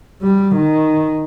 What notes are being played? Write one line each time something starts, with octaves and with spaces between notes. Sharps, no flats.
G3
D#3